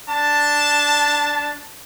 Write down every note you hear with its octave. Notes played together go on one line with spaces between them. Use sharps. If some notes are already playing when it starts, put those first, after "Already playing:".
D4 A5